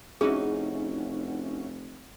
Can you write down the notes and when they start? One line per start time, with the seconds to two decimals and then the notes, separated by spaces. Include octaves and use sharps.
0.21 F1 C#4 D#4 E4 F#4 G#4